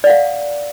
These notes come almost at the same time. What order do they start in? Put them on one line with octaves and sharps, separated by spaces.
D5 F#5 F5